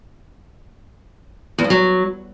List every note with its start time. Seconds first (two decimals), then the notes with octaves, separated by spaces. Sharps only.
1.58 E2
1.64 F2
1.70 F#3